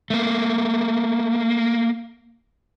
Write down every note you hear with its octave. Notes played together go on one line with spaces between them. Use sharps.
A3 A#3